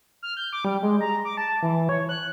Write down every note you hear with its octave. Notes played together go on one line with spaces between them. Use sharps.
F6
G6
D6
G3
G#3
A#5
D6
A5
E3
C#5
F#6